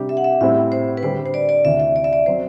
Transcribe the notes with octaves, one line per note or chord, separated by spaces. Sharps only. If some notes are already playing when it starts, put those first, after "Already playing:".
Already playing: C3 G3 D4 G4
E5
F#5
E5
A2 G3 C4 E4 E5
C5
B4
D3 G3 D4 C5
C5
D5
D5
D2 C3 E3 E5
E5
D5
E5
D5
F#3 C4 C5